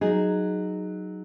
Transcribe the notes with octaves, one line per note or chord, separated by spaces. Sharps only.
F#3 D#4 G#4